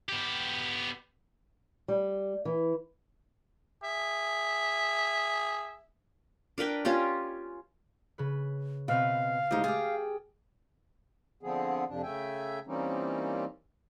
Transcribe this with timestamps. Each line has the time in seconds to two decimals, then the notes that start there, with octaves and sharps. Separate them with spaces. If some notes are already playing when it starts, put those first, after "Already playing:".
0.09 B3 G4
1.88 G3
2.45 E3
3.83 G#4 E5
6.58 D4 A#4 B4 G5
6.85 C#4 F4 G4 C#5
8.18 C#3 B4
8.88 B2 C4 B4 E5 F5 F6
9.51 D2 G#3 D#4 G4
9.64 G#4 G5 D6 F6 A6
11.43 D3 F3 B3 C4 G#4
11.88 F2 C3 F3 D4
12.03 C#3 A3 E5 G5 G#5
12.67 E3 G3 A#3 C4 C#4 D#4